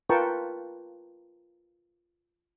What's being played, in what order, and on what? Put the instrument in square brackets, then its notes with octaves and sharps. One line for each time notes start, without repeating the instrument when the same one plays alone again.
[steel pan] F4 A#4 B4 G5 A5 C#6